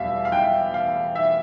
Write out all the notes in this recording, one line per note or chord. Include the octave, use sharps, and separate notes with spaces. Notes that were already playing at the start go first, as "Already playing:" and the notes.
Already playing: E2 B2 G3 E5 F5
F5
G5
F5
E5